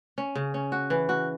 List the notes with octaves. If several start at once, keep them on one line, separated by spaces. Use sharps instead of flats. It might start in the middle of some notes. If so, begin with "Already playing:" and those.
C#4
C#3
C#4
F#4
E3
F#4